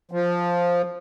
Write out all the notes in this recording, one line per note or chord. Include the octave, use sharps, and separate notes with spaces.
F3